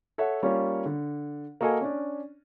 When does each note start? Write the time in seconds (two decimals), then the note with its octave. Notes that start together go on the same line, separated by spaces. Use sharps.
0.18 A4 C#5 E5 F#5
0.43 G3 A#3 C#4 F4 C#5
0.85 D3
1.61 A#3 F#4 A4 D#5 F5 G#5
1.81 C#4 D4